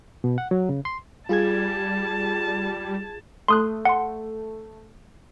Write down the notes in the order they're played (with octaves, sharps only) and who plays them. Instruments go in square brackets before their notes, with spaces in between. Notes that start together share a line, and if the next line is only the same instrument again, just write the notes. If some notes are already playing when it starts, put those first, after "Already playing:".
[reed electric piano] B2
F#5
F#3
C#3
C6
[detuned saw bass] G3 [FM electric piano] F4 G#4 G#6 [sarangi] A5
[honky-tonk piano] A3 [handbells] C6 D#6 F#6
[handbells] F#5 C6